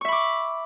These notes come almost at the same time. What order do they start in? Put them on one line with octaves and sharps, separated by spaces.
C#6 E5 B5 D6